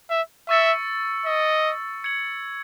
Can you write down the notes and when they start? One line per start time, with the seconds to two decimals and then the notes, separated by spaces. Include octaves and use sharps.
0.10 E5
0.49 E5 C#6 E6 A6 C#7
1.26 D#5
2.04 G#6 C#7 F#7